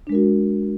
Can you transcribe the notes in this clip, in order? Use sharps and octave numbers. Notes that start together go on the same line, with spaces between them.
G#3 D4 F#4 A#4